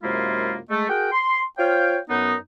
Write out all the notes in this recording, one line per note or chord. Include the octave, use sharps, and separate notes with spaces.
F#2 C3 G#3 A#3 E4 F4
G#3 A3
F#4 G#4 A#4 F#5 G5
C6
F4 C5 C#5 F5 G5
F#2 B3 D#4